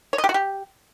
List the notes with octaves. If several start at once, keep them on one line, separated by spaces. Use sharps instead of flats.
C#5
D#5
G4
F#4
G4